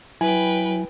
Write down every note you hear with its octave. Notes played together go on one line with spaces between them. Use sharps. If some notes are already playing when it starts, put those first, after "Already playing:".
F#3 E4 B4 G5 G#5